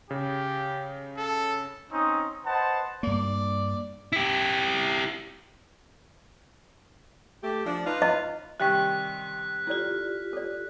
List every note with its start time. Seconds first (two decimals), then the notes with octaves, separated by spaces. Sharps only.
0.11 C#3 G4
1.18 A4
1.92 C4 C#4 D#4 D#6
2.45 B4 C5 D#5 F#5 A5
3.03 G2 A#3 D5
4.12 E4 G4
7.44 A3 G4
7.66 F3 D4
7.86 D#4 F4 B4
8.02 D#5
8.60 C3 D#3 G3 E5 G5 C#6 F#6 B6
9.67 E4 F4 G4 A4 D5
10.33 A4 D5